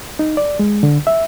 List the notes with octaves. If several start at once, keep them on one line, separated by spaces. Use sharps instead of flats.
D#4
D5
G#3
D3
E5